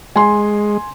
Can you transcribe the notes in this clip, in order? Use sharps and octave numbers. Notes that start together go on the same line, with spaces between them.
G#3 G#5 C6